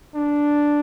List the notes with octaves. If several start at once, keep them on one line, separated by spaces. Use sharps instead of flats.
D4